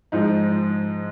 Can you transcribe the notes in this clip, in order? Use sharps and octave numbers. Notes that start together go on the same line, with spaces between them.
G#2 F3 G#3 D#4